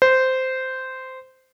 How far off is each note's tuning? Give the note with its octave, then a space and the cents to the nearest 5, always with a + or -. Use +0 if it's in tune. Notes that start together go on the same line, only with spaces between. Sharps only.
C5 -10